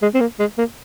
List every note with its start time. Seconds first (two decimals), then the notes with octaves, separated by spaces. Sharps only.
0.02 G#3
0.14 C4
0.21 A#3
0.40 G#3
0.58 A#3